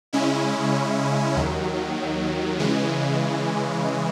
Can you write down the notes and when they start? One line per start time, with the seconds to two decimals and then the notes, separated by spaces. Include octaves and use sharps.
0.13 C#3 G#3 C#4 E4
1.36 D#2 D#3 F#3
2.59 C#3 E3 G#3